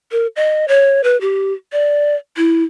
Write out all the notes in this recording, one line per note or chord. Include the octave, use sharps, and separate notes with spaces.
A#4
D#5
C#5
B4
G4
D5
E4